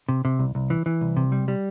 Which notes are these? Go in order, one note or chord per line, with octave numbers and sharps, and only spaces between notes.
C3
C3
C2
C2
E3
E3
C2
C3
G3
G3